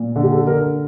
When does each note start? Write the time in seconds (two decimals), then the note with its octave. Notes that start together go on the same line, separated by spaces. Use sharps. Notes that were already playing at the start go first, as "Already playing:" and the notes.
Already playing: A#2
0.16 D3 A4
0.23 G4
0.32 A4
0.47 D3 A#4